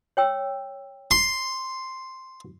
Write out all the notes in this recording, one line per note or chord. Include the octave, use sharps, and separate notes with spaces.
C#5 G5 E6
C6